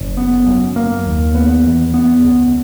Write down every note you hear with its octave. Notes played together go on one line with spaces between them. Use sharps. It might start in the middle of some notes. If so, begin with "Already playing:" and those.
Already playing: F#1
B3
F#2
A#3
D#2
B3
E2
B3
C#2